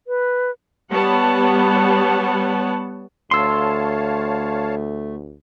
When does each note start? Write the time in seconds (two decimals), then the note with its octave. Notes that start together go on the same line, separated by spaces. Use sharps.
0.08 B4
0.91 G3 B3 C#5 F#5 A5
3.31 D2 A3 C#5 F5 A5 C6 E6